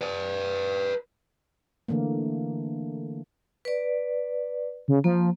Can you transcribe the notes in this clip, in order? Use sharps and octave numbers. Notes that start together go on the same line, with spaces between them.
B4 D5
D3 E3 A3 A#3
B4 D5
C#3
F3 A#3